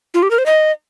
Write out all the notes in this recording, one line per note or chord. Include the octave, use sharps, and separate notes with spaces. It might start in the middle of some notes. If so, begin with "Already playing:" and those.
F4
G4
A#4
C5
D#5